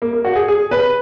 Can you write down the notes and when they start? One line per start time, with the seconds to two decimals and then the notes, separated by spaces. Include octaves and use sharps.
0.02 A#3
0.13 A#3
0.25 F#4
0.36 G#4
0.48 G#4
0.71 B4